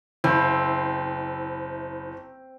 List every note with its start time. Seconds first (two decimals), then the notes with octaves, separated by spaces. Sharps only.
0.24 F#1 C4 E4